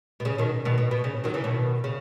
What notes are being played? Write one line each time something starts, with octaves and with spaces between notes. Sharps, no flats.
B2
C#3
B2 D#3
B2 D#3
B2
B2
C#3
D#3 F#3
C#3 E3
B2 D#3
C#3